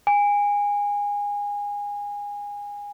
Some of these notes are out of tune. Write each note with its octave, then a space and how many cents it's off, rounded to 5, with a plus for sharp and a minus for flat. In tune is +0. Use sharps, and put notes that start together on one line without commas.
G#5 -25